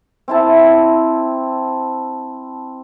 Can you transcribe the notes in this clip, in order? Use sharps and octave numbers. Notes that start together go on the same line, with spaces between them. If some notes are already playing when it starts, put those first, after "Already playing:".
C4 E4 A5